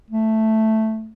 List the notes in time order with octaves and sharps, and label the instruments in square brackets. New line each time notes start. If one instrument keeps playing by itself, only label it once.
[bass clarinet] A3